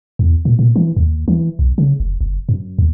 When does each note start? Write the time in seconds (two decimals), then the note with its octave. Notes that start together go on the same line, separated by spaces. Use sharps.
0.19 E2
0.45 A#2
0.59 A#2
0.76 E3
0.97 D#2
1.28 E3
1.59 B1
1.78 C#3
2.00 F1
2.21 F#1
2.49 F#2
2.79 D#2